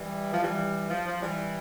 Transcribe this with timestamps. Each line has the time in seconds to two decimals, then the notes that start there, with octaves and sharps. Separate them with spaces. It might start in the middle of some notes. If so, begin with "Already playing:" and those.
Already playing: E3 G3
0.32 F3
0.43 E3 G3
0.90 F3
1.07 F3
1.22 E3 G3